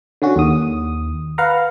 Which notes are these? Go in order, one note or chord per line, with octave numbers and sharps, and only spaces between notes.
D3 C#4 F#4
D#2 D#6
B4 F5 F#5 A#5